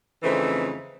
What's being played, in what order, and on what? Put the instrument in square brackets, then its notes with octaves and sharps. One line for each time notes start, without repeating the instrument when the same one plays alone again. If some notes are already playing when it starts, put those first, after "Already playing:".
[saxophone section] F2 C#3 E3 A3 C4 D#4